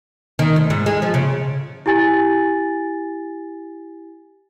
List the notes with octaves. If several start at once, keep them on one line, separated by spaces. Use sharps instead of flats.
D#3
D2
G#2
G#3
F3
C#3
E4 G4 G#5 A6